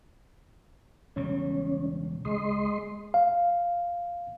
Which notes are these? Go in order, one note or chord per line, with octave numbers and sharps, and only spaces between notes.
E1 C#3 G3 C#4
C#2 G#3 D#5 C6
F5